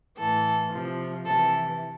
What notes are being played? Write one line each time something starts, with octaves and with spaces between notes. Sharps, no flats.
A2 E3 A4
C3 F3
C3 E3 A4